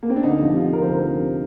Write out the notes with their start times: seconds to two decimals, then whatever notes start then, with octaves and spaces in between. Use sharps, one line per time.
0.03 A#3
0.10 C4
0.16 D4
0.23 D2 D#4
0.40 C3 F3
0.56 D2 F4
0.72 C3 F3 A#4
0.82 C5
0.89 D2 A#4
1.05 C3 F3